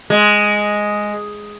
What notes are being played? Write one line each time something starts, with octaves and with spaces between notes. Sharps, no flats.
G#3